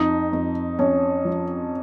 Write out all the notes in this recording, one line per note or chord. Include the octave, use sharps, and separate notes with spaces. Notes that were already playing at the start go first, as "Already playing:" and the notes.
Already playing: F2 D#4
F2
F2 C#4
F3